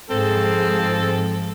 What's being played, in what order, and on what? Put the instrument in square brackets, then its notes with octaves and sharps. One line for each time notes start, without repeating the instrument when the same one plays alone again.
[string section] G#2 F3 [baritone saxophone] C4 [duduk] G#4 [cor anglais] A4